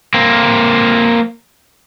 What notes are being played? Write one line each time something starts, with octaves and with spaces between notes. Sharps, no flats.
A#3 C4